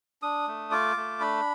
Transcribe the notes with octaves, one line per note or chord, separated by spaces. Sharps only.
D4 D#6
A3
F4 D6
A3
D4 B5